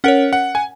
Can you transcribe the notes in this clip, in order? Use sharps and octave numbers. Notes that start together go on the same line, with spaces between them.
C#4 A#4 C#5 F#5
F#5
G#5